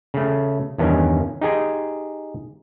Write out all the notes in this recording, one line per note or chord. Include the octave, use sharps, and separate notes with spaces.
C#3 A3
E2 G2 D#3 C#4
D#4 G4 G#4 G#5